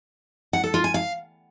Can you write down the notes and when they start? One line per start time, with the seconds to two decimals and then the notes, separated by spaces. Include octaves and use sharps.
0.53 F#5
0.64 A4
0.74 F4
0.84 G#5
0.94 F5